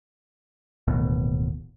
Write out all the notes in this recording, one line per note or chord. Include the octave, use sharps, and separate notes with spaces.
D1 A1 D#2 B2